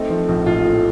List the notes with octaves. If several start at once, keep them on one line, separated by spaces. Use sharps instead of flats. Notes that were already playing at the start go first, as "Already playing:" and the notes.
Already playing: A3 C4 D#4
F3
A#1
A2 F4
A3